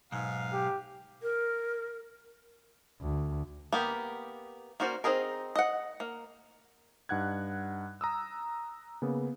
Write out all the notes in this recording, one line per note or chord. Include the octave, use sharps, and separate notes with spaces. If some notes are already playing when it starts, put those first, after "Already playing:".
B1 G#2 F5
G4
A#4
D2
A#3 B3 G4
A#3 C#4 F#4 C5 D5
C4 D#4 G#4 A#4
D#5 F#5
A#3
G2 D#4 F#5 F#6 G#6
A#5 D#6 E6
C#3 A#3 B3